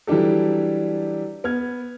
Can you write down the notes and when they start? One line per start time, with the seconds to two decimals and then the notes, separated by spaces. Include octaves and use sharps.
0.07 E3 F#3 G3 D4 G4 A4
1.44 B3 F6 G#6